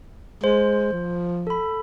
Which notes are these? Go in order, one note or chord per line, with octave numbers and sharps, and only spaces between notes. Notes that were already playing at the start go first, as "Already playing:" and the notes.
G#3 C5
F3
A4 B5